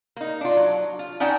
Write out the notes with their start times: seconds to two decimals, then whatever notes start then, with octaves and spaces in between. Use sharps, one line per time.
0.16 A#3 D#4
0.41 D4 F4
0.57 F#3
0.99 F4
1.20 C#4 D#4 D5 F#5 G5 A5